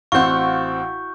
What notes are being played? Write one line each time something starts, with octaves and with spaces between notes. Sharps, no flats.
A1 C4 E4 F#4 F5 F#5 C#6 G6